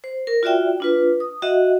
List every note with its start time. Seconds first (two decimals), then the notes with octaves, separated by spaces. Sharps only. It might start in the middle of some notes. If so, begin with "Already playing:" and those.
0.04 C5
0.27 A#4
0.43 F4 F#4 D5 E5 G5
0.80 D4 F4 B4
1.20 D#6
1.42 F#4 D#5 E5 F#5